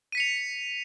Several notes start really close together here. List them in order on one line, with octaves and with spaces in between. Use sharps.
D#7 B6 C#7 F7